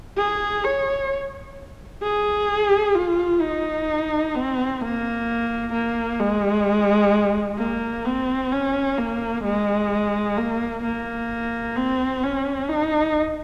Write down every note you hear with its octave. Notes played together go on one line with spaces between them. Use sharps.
G#4
C#5
G#4
F4
D#4
C4
A#3
A#3
G#3
A#3
C4
C#4
A#3
G#3
A#3
A#3
C4
C#4
D#4